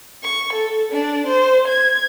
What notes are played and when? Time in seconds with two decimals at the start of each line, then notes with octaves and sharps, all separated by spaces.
0.23 C#6
0.53 A4
0.92 D4
1.27 C5
1.67 G#6